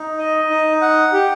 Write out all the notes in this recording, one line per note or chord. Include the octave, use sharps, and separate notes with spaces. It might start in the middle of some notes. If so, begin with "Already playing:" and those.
Already playing: D#4
D#5
D#4
F#5
G4